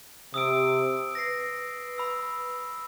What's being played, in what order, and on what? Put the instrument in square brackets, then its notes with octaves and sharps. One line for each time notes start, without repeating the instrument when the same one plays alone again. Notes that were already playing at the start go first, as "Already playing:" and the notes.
[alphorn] C3 [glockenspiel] D#6 E6 D7
[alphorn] B4 [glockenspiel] A#6 C7
[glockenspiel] B5 E6